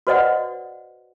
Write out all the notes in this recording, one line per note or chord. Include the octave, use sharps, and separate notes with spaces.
F#4 B4 C5 D5 D#5 F#5